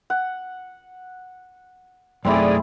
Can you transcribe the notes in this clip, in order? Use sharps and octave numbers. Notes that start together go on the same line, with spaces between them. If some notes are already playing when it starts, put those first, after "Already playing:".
F#5
F#2 A3 C4 E4 G#4 D5